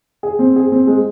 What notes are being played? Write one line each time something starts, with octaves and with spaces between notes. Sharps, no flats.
G#4
C4
G#4
C4
G#3